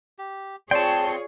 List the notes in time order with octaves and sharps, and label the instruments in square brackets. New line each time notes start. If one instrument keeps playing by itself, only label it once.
[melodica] G4
[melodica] C4 C6 [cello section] F4 G#4 C#5 [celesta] D5 [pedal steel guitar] G5 A5